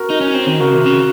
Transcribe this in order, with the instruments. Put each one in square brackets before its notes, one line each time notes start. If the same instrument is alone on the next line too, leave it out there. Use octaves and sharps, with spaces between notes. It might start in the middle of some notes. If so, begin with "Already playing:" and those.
Already playing: [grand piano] F#4 A#4
[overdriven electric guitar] D#4
C#4
C4
D#3
[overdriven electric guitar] C#3 [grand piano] F#4 A#4
[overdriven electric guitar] C3
C#3